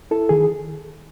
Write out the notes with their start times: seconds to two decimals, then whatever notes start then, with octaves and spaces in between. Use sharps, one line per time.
0.11 E4 A4
0.29 D#3 G#4